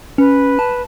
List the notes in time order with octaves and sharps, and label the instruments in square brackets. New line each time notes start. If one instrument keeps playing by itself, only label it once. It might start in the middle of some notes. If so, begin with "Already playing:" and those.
[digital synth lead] C#4 [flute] B4
[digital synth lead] A5